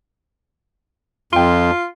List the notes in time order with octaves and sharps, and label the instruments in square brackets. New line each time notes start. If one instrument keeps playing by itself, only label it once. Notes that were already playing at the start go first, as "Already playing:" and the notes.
[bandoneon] F2 [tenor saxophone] F4 [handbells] G5 C6